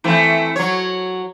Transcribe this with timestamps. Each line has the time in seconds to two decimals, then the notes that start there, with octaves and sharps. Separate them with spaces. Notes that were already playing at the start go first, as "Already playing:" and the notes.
0.04 E3 A3 C4
0.56 F#3 C#5